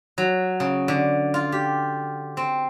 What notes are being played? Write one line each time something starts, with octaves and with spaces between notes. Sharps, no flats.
F#3
C#3
D3
F4
G4
C4